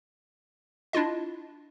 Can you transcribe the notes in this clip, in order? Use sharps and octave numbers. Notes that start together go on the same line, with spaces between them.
D4 E4 F4 D#5